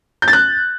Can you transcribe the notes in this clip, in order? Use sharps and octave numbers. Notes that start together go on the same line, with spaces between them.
G6
A6
F#6